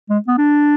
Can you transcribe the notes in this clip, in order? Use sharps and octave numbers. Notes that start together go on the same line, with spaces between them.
G#3
B3
D4